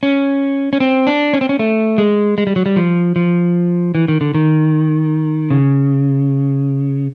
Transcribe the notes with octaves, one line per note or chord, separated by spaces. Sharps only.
C#4
C#4
C4
D4
C#4
C4
C#4
A3
G#3
G#3
G3
F#3
G3
F3
F3
E3
D#3
D3
D#3
C#3